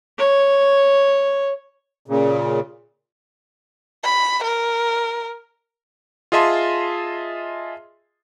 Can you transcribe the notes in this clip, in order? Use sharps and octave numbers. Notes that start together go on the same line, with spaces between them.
C#5
A#2 C#3
B5
A#4
F4 G#4 D#5 E5 A5 C6